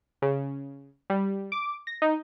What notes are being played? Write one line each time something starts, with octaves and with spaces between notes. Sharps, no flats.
C#3
G3
D6
A#6
D#4